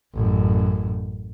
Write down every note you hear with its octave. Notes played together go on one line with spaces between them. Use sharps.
A1 F#2